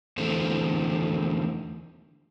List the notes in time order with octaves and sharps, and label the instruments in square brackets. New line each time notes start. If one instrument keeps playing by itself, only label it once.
[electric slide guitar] E2 D3 A3 C4